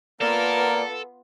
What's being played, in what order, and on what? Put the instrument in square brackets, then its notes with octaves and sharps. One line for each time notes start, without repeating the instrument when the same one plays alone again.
[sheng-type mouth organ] A#3 D5 [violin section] B3 F4 [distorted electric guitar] A4 [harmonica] A#4